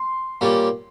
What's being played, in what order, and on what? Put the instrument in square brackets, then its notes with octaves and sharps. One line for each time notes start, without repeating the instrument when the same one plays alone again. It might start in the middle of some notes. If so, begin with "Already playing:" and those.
Already playing: [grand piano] C6
[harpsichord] A#2 G3 C#4